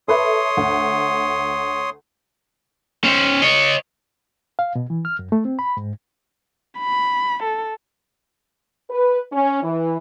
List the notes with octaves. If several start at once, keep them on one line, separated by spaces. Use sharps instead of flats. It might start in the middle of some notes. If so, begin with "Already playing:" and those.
A4 B4 C#5 E5 C6 D#6
D2
C#4 C5
C#5 D#5
F5
B2
E3
F6
F#2
A3
C4
B5
G#2
B5
A4
B4
C#4
E3